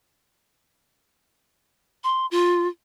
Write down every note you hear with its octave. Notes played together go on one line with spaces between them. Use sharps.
C6
F4